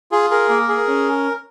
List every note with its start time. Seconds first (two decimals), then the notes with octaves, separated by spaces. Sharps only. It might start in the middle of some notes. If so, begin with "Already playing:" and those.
0.11 F4 G#4
0.30 G#4 A#4
0.49 A#3
0.68 G#4
0.88 C#4